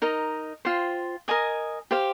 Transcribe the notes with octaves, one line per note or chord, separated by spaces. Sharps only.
D#4 A#4 D#5
F4 C5 G5
A#4 D#5 G#5 D#6
G4 C5 F5